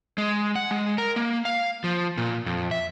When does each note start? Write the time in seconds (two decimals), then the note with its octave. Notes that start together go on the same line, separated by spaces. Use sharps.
0.18 G#3
0.56 F#5
0.71 G#3
0.98 A#4
1.16 A#3
1.45 F5
1.84 F3
2.18 A#2
2.46 F2
2.71 E5